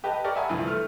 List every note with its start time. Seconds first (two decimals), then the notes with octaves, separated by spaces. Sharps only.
0.04 G4 B4 D#5 A5
0.24 G4 A#4 D5 C#6
0.36 E5 F#5 G#5 A5 B5 D#6
0.49 C2 D3 E3 F3
0.67 A3 F6